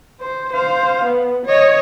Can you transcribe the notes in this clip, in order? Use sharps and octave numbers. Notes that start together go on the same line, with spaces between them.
C5
C5 F5
B3
C#5 D#5